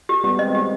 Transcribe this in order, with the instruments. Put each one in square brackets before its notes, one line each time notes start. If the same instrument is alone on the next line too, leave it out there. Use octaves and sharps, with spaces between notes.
[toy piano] G4
[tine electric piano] G3 B3 [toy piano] G4
[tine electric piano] G#3 C4 [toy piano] D#5
[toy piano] G4